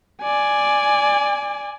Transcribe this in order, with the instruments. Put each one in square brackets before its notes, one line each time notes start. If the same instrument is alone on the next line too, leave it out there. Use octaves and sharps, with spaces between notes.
[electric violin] D5 G#5